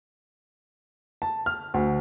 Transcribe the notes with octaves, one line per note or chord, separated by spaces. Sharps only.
A5
F6
D2